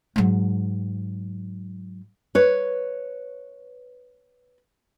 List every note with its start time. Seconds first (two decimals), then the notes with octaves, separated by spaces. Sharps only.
0.16 G#2 F#3
2.35 B4 C#5